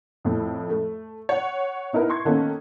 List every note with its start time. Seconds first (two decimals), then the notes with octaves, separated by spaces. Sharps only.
0.25 F2 A2
0.70 A3
1.29 C#5 F#5
1.93 B3 D#4 E4 A#4 B4
2.10 C6 C#6 G#6
2.25 D#3 A#3 B3 C#4 A4 D#5